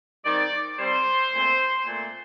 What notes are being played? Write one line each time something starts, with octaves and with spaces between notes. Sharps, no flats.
D#3 G3 C4 D5
C3 G3 C4 C5
A#2 A3 C4
A#2 A3 C4